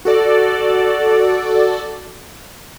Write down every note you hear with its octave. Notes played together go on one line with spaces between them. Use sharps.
F#4 A4 D5